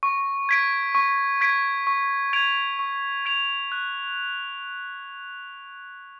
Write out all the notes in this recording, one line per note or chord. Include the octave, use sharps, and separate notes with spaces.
C#6
G#6 B6 D7
C#6
G#6 B6 D7
C#6
G#6 D7 F7
C#6
G#6 D7 F7
F#6